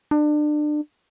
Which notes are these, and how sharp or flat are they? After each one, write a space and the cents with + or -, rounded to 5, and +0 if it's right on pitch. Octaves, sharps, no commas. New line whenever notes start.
D4 +30